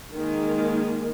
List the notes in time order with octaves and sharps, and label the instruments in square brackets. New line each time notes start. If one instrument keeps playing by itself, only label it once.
[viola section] D#3 G#3 A#3